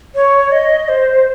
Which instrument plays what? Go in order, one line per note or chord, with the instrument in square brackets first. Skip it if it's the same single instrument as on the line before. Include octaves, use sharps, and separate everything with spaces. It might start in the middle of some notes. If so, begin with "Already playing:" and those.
[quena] C#5
D#5
C5